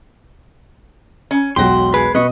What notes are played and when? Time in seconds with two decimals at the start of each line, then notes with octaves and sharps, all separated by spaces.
1.31 C#4
1.56 E1 B1 F#3 F#4 G4 C6
1.94 G#3 B4
2.15 B2 B4 D#5 C#6